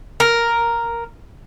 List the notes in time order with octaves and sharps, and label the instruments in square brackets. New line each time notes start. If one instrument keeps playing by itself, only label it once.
[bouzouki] A#4